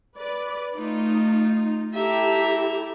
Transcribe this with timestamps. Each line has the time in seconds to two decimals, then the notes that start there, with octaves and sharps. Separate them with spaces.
0.17 B4 D5
0.76 A3 D#4 F4
1.94 E4 G4 A4 E5 A#5